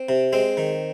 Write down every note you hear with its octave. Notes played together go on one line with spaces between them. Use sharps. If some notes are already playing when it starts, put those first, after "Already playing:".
Already playing: C4
C3
G#3 C4
D#3